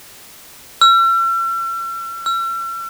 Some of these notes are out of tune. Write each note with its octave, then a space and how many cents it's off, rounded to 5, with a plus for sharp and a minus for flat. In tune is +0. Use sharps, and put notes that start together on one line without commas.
E6 +45
E6 +45